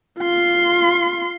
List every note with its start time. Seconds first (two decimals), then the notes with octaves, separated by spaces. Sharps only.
0.20 F4 C6